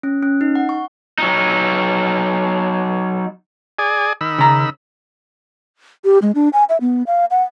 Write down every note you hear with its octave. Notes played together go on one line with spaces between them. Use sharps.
C#4
C#4
D#4
F#5
C#6
F#3 D#4
G#4 D5 G#5
D#3 B5 E6
C#3 A#5
G4
G#3
D4
G#5
E5
B3
F5
F#5